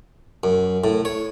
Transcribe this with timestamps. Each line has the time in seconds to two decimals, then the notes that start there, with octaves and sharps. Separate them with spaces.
0.44 F#2
0.84 A2
1.05 C#5